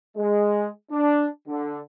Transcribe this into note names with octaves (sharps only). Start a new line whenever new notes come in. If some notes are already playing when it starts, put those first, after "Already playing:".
G#3
D4
D3